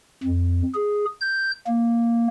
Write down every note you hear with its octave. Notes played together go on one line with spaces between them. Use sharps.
F2
G#4
G6
A#3